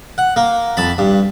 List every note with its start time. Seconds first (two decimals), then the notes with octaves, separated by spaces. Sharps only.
0.18 F#5
0.36 A#3
0.77 F2 A5 B5
0.98 G2